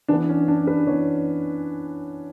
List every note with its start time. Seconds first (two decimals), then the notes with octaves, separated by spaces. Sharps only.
0.08 E3 B3 D4
0.29 C#4
0.48 D4
0.67 B4
0.87 E3 B3 C#5